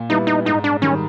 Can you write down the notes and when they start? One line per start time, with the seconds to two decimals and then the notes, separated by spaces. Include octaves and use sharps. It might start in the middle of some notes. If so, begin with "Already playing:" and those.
Already playing: A#2
0.09 G3 B3 D#4 E4
0.27 D#4
0.45 G#2 D#4
0.64 D4
0.82 D#3 G3 C#4